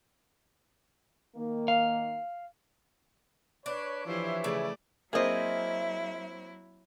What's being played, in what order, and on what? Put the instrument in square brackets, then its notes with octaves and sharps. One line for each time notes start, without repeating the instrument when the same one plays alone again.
[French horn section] D#3 A#3
[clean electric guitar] F5
[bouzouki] D4 [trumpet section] B4 C#5
[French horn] E3 [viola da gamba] F3 G4 C5 [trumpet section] E4 C#5 E5
[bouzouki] C#3 A5 [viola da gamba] A3 D5
[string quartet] F#3 E4 [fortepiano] A#3 C4 [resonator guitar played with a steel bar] G#4 D#5 [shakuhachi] E5